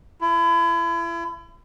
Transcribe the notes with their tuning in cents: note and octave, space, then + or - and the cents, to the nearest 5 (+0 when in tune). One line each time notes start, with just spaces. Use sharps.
E4 +35